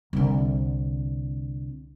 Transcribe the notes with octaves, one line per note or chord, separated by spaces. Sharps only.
C2 D3